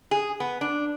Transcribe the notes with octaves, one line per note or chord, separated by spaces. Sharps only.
G#4
B3
D4